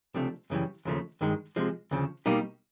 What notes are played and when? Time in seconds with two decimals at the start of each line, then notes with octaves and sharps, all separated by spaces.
0.14 C#2 C3 F3 A3 D4
0.50 F#2 C#3 E3 G3
0.85 D#2 C#3 F3 A3
1.21 G2 D#3 G#3
1.56 C3 F3 G#3
1.91 D2 C#3 F3
2.26 B2 G3 A#3 D#4 G4